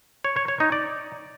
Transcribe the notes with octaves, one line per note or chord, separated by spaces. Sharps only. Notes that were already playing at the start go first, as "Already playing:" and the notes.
C#5
C#5
C#5
D#4
D5